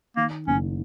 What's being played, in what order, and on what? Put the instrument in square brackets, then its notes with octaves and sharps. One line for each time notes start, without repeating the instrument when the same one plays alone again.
[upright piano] D#3 [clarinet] A#3
[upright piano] F#1 [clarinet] C#4